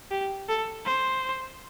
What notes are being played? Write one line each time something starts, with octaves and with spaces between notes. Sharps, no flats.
G4
A4
C5